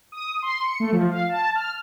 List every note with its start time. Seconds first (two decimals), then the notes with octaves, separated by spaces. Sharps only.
0.12 D#6
0.42 C6
0.65 C#7
0.80 A3
0.92 F3
1.10 F5
1.29 A5
1.55 F6